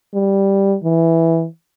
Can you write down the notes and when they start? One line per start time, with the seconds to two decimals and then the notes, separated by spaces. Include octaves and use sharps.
0.14 G3
0.84 E3